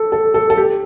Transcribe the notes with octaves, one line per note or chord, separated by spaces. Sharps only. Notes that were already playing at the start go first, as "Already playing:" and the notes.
Already playing: A4
A4
A4
A4
G4